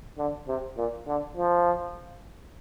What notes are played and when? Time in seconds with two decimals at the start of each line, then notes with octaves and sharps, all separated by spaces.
0.18 D3
0.48 C3
0.77 A#2
1.07 D3
1.37 F3